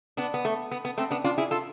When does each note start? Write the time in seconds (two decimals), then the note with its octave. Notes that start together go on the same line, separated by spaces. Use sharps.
0.17 B3 D4
0.34 B3
0.45 A3
0.71 B3
0.85 B3
0.98 A3 C4
1.11 B3 D4
1.24 D4 F4
1.38 E4 G#4
1.51 F4 A4